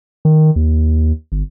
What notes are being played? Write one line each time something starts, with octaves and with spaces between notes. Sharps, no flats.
D#3
D#2
G1